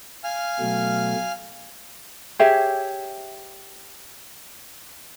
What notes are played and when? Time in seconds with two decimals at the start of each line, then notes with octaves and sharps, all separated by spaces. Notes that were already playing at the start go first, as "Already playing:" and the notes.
0.24 F5 G#5 F6
0.60 B2 F#3 A3
2.39 G4 G#4 C#5 E5